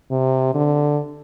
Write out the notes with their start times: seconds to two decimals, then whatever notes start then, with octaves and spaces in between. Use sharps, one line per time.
0.11 C3
0.54 D3